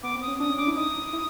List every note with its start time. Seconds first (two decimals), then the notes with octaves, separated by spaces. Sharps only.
0.03 B3 D6
0.15 C4
0.22 D#6
0.27 C#4
0.40 D4 D#6
0.50 C#4
0.58 D4 D6
0.67 E4
0.76 D#4 D#6
1.13 E4